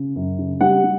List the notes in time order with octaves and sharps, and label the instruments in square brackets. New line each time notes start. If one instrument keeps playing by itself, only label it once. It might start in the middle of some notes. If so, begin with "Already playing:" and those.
Already playing: [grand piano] C#3
F#2
C#3
G3 F#5
G3